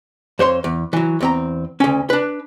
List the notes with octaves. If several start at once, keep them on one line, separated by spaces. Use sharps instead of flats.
F2 C5 C#5 C6
E2
E3 F#3
E2 C4 A#5
D2 C#4
D4 B4